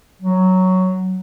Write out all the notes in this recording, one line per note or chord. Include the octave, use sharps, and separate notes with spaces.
F#3